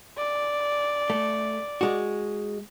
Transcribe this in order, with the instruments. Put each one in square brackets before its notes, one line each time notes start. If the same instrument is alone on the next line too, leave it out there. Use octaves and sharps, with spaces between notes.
[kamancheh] D5
[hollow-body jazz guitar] A3
G#3 F#4